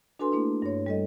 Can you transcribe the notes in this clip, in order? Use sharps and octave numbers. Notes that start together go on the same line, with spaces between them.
D4 F#4 A4 B4 G#5 C6
A3 A#3 D4 E4
G2 C#5
G3 A4 D#5